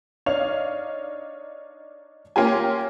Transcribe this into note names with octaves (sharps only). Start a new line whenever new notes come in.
D4 D#4 C#5 F5 F7
A#3 C#4 F4 G4 G#5